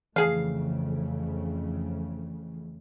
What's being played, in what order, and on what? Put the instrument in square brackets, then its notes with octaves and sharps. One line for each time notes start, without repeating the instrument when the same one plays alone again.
[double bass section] F2 C#3 A3 [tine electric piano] E3 [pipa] G#4 F5